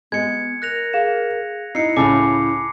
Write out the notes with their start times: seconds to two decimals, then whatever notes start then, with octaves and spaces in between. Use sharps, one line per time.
0.12 G#3 B3 G#6 C#7
0.62 A#4 F#6 A#6 F7
0.93 G#4 F5 E7
1.75 D#4 E4 E6 C7 C#7
1.97 C#2 A2 G#5 A5 B5 D6 E6